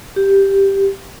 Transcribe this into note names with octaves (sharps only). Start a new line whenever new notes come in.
G4